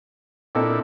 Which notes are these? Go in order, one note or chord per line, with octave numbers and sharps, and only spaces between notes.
A#2 C4 D4 E4 A4 D#5